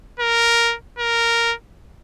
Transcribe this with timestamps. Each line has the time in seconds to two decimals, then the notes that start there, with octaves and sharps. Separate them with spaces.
0.20 A#4
0.99 A#4